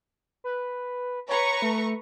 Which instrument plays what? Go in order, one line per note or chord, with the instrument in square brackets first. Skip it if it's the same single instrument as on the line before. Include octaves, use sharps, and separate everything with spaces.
[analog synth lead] B4
[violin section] B4 A#5 C#6 [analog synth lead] C#5
[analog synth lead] A3